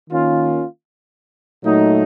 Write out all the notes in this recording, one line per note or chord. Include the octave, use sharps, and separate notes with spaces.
D#3 A#3 C#4 F4
A#2 F#3 A3 D#4